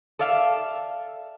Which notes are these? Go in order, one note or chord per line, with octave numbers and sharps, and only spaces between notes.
A4 D5 E5 F5